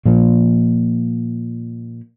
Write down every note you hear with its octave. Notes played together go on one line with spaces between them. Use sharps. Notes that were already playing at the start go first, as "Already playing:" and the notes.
A#2 F3